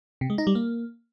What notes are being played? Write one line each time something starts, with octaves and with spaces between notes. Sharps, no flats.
C3
G#3
D#4
G3
A#3